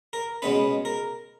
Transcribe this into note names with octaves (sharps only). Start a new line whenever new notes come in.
A#4
B2 G#3 C#4 B4
A#4